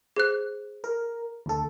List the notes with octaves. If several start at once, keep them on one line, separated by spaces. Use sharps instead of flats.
G#4 C5 F#6
A#4
D2 A4